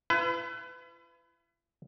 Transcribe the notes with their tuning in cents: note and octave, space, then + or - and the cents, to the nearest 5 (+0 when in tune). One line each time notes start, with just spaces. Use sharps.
E4 +45 B4 +30